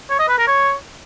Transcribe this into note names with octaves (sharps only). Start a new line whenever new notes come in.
C#5
D#5
B4
A#4
C#5